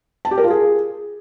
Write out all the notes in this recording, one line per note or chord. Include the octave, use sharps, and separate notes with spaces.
A5
G4
A#4
F4
G#4